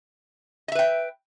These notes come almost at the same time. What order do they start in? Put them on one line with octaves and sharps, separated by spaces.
D#5 E5 B4 G5